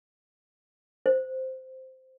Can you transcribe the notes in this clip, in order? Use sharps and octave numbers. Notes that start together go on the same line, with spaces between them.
C5